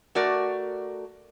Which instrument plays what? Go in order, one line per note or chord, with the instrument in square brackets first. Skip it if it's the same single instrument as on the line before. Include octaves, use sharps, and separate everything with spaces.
[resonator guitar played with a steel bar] A3 F#4 A#4 D5